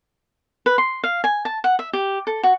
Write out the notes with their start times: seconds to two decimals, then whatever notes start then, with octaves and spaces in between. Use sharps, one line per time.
0.66 B4
0.78 C6
1.04 F5
1.24 G#5
1.45 A5
1.64 F#5
1.79 E5
1.93 G4
2.27 A4
2.43 F#4